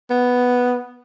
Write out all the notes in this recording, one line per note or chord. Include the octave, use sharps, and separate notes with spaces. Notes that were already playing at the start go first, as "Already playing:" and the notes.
B3